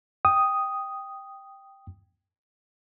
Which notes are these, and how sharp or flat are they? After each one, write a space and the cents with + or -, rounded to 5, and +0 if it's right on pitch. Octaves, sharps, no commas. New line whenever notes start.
G5 +0 D#6 +0